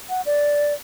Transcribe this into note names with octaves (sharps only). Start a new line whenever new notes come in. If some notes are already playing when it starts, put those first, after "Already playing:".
F#5
D5